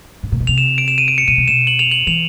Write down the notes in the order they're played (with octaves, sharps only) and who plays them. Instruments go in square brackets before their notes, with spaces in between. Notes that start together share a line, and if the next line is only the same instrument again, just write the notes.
[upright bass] A2
A#2
B2
[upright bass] C3 [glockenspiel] F7
[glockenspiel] E7
D7
E7
D#7
D7
C#7
[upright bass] B2 [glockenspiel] D#7
[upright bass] C3
[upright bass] B2 [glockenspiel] E7
[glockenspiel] F#7
F7
F#7
[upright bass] E3 [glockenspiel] F7